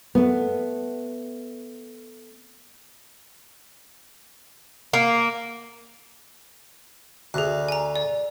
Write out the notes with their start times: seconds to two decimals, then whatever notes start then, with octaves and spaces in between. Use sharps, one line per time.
0.15 A3 B3
4.93 A#3
7.34 D2 G#4 F#6
7.68 G#5 A#5
7.96 D5